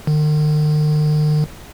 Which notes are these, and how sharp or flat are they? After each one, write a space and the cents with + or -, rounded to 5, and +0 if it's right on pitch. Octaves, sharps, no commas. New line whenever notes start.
D#3 -45